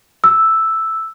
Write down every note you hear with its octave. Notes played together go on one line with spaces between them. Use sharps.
E6